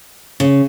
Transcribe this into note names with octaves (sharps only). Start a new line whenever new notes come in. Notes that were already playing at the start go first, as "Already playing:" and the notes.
C#3